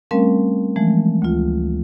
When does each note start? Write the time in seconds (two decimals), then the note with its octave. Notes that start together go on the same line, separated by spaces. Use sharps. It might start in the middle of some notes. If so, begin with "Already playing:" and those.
0.11 G3 A3 C4 C#4 A#4 F5
0.76 E3 F3 G#3 A3
1.22 D2 F4